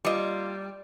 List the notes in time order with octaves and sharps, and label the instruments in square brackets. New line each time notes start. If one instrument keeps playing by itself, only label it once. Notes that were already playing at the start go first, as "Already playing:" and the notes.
[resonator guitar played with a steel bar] G3 [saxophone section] A#3 E4 F4 [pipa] D5 D#5